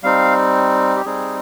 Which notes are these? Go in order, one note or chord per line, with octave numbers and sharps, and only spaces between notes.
G3 C4 D#4 F5
G4
G3 C4 D#4 G#4